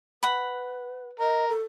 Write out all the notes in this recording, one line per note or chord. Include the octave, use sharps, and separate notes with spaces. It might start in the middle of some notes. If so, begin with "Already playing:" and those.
B4 F#5 B5
A#4 D#5
A4